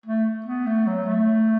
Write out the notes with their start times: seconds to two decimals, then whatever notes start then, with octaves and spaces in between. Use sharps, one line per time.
0.06 A3
0.46 B3
0.66 A3
0.87 F#3
1.06 A3